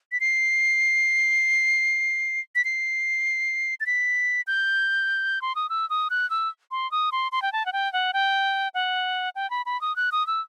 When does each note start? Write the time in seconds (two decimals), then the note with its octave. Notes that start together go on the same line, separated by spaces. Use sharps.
0.12 B6
0.20 C7
2.55 B6
2.65 C7
3.80 A6
3.86 B6
4.47 G6
5.42 C6
5.56 D#6
5.70 E6
5.90 D#6
6.10 F#6
6.30 E6
6.71 C6
6.91 D#6
7.12 C6
7.32 C6
7.42 G5
7.53 A5
7.66 F#5
7.73 G5
7.93 F#5
8.13 G5
8.74 F#5
9.36 G5
9.50 B5
9.66 B5
9.81 D#6
9.96 F#6
10.12 D#6
10.27 E6